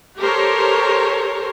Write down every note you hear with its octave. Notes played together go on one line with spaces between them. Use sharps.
G4 A4 A#4 C5 C#5